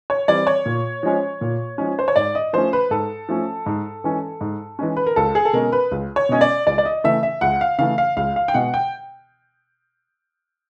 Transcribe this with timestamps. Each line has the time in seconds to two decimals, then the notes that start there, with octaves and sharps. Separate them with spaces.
0.10 C#5
0.28 E3 G3 C4 D5
0.47 C#5
0.66 A#2
1.03 F3 G#3 C#4
1.41 A#2
1.78 F3 G#3 C#4
1.99 C5
2.08 C#5
2.16 G#2 D5
2.35 D#5
2.53 F3 A3 C#4 C5
2.73 B4
2.91 G#2 A4
3.29 F3 A3 C#4
3.66 G#2
4.04 E3 G#3 C#4
4.41 G#2
4.79 E3 G#3 C#4
4.97 B4
5.07 A#4
5.16 C#2 A4
5.35 G#4
5.45 A4
5.53 B2 G#3 C#4 A#4
5.72 B4
5.91 C#2
6.16 C#5
6.29 B2 G#3 C#4 D#5
6.41 D5
6.67 C#2 D5
6.78 D5
6.85 D#5
7.04 C#3 E3 A3 E5
7.23 E5
7.41 C#2 F#5
7.61 F5
7.79 C#3 E3 A3 F5
7.98 F5
8.17 C#2 F5
8.36 F5
8.48 G5
8.54 B2 G#3 B3 F#5
8.74 G5